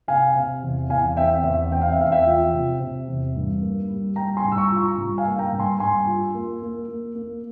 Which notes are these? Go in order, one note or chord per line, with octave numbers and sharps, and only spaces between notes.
C3 F5 G#5
C3
E2
E2 F5 G#5
C4 E5 G5
E2 E5
C4 G5
F5
E5
E2 F5
E5 G5
F3
C3
C3
E2
G2
A#3
G3
G3 G5 A#5
G#5 C6
G2
E6
A#5 C#6
F4
A#5 C#6
G2
F5 G#5
A#3
G5 A#5
G2
G#5 C6
G2 G#5 C6
F4
A#3
A#3
A#3
A#3